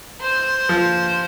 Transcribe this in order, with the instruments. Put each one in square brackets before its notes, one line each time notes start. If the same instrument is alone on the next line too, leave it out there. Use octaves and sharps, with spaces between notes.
[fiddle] C5
[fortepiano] F3